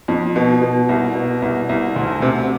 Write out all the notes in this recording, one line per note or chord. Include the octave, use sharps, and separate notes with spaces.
F2
B2
B2
C2
B2
C2
C2
D2
C3